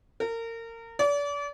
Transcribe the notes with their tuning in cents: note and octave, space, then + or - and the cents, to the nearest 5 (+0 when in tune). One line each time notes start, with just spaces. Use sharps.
A#4 -30
D5 -35